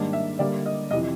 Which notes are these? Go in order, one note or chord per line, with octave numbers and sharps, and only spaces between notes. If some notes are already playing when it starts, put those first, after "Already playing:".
Already playing: G#2 D#3 G3 A#3 D4
E5
D3 G3 A#3 D5
D#5
F2 C3 E3 D#5